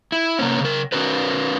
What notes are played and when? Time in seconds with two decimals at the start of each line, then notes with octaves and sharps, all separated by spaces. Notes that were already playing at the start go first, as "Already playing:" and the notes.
0.12 E4
0.39 C3 A#3 B3 C#4
0.60 C#3 A#4
0.92 C#4 F#4 A#4 B4